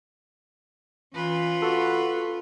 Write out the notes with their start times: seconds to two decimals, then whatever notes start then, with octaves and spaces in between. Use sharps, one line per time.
1.15 E3 C#4 F4 B4
1.62 F#4 A4